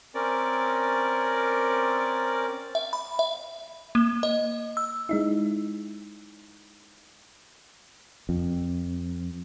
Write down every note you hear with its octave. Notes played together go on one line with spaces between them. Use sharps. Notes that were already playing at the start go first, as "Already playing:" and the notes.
C4 C#4 A#4 D5
E5
B5
E5
A#3
D#5
E6
G#3 D#4 E4
F2